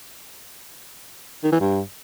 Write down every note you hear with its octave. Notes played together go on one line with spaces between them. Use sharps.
D#3
E3
G2